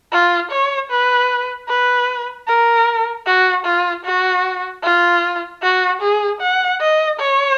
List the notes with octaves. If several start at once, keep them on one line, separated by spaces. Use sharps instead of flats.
F4
C#5
B4
B4
A#4
F#4
F4
F#4
F4
F#4
G#4
F#5
D#5
C#5